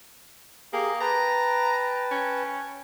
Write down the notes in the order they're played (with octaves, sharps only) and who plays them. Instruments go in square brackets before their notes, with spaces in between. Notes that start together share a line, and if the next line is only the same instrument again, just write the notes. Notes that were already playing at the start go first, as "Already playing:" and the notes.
[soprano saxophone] A#3 [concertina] G4 G#4
[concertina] B4 G5 A5 [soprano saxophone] A#5
[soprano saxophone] C#4